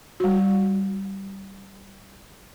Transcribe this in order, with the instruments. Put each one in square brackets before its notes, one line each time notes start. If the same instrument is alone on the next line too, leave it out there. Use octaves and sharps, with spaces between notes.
[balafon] G3 F#4